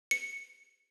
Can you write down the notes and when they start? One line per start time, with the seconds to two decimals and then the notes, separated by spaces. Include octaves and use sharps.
0.11 C#7